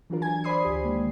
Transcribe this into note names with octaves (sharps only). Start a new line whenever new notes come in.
E3 F#3 D4 F4 A#4
G#5 G#6
C5 D5 B5 C6 D#6 C7
D2 G4
D#3 G#3 A#3